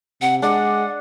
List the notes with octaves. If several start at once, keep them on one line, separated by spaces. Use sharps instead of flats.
C3 F#5
G#3 D4 F#5